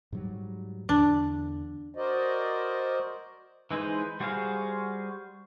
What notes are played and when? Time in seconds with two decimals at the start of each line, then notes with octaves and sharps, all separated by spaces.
0.12 G#2 F#3 G3
0.89 E2 D3 D4
1.95 F#4 A#4 C5 D5 D#5
3.71 E3 G#3 D#4 B4 C5
4.20 G3 F#4 G#4 C5 F5